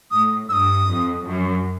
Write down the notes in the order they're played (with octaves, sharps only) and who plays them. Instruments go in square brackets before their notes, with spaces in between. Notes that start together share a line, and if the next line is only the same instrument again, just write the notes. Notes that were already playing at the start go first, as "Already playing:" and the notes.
[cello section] A2 [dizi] D#6
[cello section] G2 [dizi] E6
[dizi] D#6
[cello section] F2
F#2